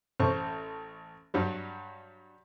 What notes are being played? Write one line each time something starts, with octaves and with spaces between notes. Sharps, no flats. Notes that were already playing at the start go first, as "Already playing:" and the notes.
A1 C5 C#6
G2 F#3 G3